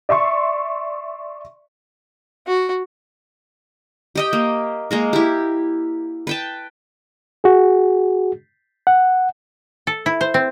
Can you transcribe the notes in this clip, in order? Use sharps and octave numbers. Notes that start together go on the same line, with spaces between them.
D5 E5 C6 C#6
F#4
G4 D#5 G5
A#3
G#3 A#3 A#4
E4 G4
B4 G5 A5
F#4 G#4
F#5
A4
E4
C5
C4